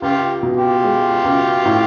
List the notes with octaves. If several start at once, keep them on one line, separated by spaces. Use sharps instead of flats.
C#2 F4 G4
B2
F4 G4
G#3
C#2
A2